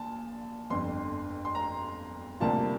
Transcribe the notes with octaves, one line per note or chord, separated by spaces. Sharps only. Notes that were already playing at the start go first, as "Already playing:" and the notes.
Already playing: A#1 A#2 A5
G1 F2 D3 C6
C6
A#5
D2 C3 G3 A#3 F4 A5